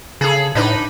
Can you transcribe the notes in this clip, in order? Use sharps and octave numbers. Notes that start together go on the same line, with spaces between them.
C#3 G#4 A4
A2 D4 D#4 B4